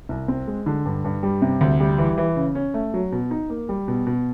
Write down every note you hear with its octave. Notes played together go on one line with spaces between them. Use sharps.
C2
C4
G#3
D3
G2
G2
G3
C3
D2
G3
E3
E3
C#3
C#4
A3
F#3
B2
D#4
A#3
G3
B2
B2